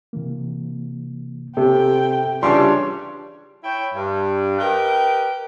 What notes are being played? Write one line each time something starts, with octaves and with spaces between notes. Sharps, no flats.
C3 E3 A#3
C3 C4 G4 A4 G5
C#3 E3 G3 D4 F4 C#5 C6
E4 C#5 G5
G2
G4 A#4 B4 D#5 G5